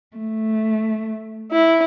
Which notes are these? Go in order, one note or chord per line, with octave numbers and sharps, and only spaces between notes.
A3
E4